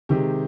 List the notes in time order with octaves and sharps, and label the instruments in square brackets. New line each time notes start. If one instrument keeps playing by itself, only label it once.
[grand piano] C3 D#3 G#3 G4